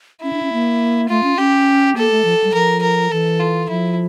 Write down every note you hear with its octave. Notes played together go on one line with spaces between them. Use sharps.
C#4 E4
D4
C#4
A#3
A3 F4
C#4
C#4 G4
A#3 A4
A3
F3
G3
F3 A#4
A#4
E3 A4
F4
F3 E4